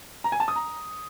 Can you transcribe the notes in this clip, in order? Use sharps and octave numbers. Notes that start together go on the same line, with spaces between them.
A#5
G#5
A5
D#6
A#5